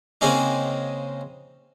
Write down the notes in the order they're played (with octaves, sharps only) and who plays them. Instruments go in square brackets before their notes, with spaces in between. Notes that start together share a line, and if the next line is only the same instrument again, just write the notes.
[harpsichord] C#3 G#3 A#3 C4 C#4 D#4